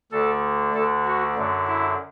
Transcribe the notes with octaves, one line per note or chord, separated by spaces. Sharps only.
D2 D3 A4
D2 D3 A4
F#4
F#2 D3
E4